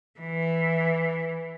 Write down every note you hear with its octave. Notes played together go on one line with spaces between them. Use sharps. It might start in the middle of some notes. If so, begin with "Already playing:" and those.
E3